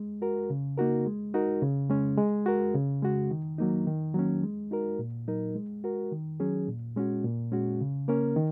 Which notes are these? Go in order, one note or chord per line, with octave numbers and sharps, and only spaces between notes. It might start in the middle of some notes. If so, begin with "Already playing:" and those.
Already playing: G#3
F#4 A#4
C#3
A#3 D#4 F#4 A#4
G#3
D#4 F#4 A#4
C#3
G#3 C#4
G#3
F#4 A#4
C#3
G#3 F#4
D#3
F#3 A#3 D#4
D#3
F#3 A#3 C#4
G#3
D#4 F#4 A#4
A#2
F#3 D#4 A#4
G#3
F#4 A#4
D#3
F#3 C#4 G#4
A#2
G#3 C#4 F#4
A#2
G#3 C#4 F#4
C#3
A#3 C#4 A#4
D#3